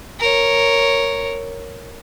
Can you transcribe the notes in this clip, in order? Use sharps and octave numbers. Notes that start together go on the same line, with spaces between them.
A#4 C#5